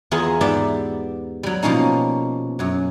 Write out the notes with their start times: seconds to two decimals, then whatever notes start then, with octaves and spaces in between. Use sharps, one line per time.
0.11 E2 B3 F4 G#4 A#4 E5
0.41 G#2 B3 G4 D5 E5
1.43 F#3 G3
1.63 B2 F3 A#3 C#4 D#4
2.59 F#2 F#3